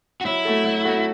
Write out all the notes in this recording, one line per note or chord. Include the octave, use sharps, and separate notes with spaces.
F#4
F#3 E4
A3 F#4 A4
F#3
A3 F#4 A4